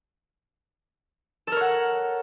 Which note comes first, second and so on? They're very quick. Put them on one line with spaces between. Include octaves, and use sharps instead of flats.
A4 A#4 C#5 F#5